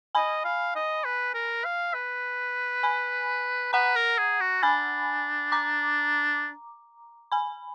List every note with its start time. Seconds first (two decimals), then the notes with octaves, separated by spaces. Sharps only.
0.15 D#5 G#5 B5
0.45 F5
0.75 D#5
1.04 B4
1.34 A#4
1.65 F5
1.94 B4
2.83 G#5 B5
3.73 B4 F#5 A#5
3.96 A#4
4.18 G#4
4.41 F#4
4.63 D4 G#5 B5
5.52 A#5 D6
7.32 G#5 B5